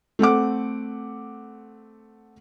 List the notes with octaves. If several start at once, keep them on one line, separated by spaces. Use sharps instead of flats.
A3 C4 F#5 D6